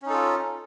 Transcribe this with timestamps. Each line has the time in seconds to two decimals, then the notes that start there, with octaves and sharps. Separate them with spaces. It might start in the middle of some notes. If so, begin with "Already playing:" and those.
0.02 C#4
0.06 D#4
0.10 A4
0.13 F4